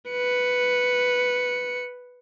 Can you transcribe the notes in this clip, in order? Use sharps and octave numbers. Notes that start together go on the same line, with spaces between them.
B4 C#7